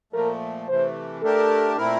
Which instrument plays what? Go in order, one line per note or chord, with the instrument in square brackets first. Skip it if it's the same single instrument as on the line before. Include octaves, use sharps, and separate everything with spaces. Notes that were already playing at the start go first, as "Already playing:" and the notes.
[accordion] A#2 F3 A3 [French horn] A#4
[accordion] C3 E3 A3 [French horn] C5
[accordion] A3 D4 G4 A#4 [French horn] A4
[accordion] A#2 A3 C4 E4 A#4